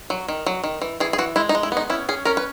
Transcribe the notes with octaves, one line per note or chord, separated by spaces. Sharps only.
F#3
D#3
F#3
D#3
E3
E3 G#4
G#4
E3 F#4
G#3 E4
D#4
G#3
E4
B3 D#4
C#4 E4
C#4 G#4
C#4 A#4
B4